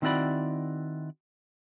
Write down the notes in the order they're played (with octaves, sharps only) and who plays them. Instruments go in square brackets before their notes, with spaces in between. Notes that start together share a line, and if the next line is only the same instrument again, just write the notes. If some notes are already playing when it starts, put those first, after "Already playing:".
[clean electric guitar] D#3 C4 E4 F#4 D5 B5